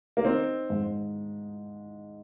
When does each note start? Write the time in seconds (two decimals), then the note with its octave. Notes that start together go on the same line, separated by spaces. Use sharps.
0.17 A#3
0.25 C4 D#4
0.70 G#2